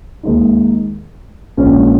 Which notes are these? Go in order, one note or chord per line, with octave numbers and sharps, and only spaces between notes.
D#2 D#3 G#3 D#4
A#1 A#2 G#3 C#4